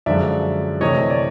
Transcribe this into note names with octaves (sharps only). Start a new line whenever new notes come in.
F#2 D3 F3 G#3 D5 E5
C3 E3 A3 C#5 D#5
D5